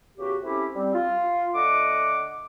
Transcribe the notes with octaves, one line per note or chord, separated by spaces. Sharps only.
E2 C#3 F#4 G4
A3 C4 C#4 E4 G4
G3 C4
F4
D3 A3 D#5 F#5 D6